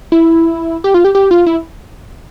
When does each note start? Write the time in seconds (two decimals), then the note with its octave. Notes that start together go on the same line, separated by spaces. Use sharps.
0.12 E4
0.84 G4
0.94 F4
1.04 G4
1.15 G4
1.31 F4
1.46 E4